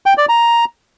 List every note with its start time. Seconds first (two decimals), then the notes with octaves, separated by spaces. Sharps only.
0.06 G5
0.17 D5
0.29 A#5